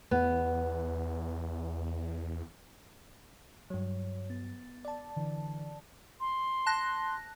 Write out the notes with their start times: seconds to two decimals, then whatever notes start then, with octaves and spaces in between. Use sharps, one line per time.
0.11 E2 B3
3.70 G2 F#3 C#5
4.30 B3 A6
4.85 D5 A5
5.16 D3 E3
6.20 C6
6.66 A5 F#6 A#6